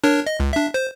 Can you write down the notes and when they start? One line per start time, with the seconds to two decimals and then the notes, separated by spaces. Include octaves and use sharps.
0.04 D4 A#4 C#5
0.27 D#5
0.40 C#2
0.53 D4 E5
0.74 C5